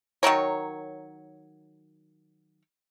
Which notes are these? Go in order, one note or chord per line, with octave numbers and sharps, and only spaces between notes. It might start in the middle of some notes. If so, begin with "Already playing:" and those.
D#3 F#3 A#4 C#5